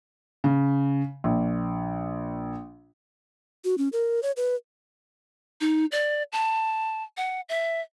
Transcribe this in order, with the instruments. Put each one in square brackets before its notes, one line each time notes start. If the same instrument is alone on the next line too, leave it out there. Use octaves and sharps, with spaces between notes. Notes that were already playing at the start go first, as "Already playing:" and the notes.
[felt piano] C#3
A#1
[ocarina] F#4
C#4
A#4
C#5
B4
[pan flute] D#4
D5
A5
F#5
E5